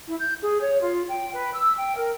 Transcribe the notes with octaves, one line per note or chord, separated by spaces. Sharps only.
E4
G6
G#4
C#5
F4
G5
B4
E6
G5
A#4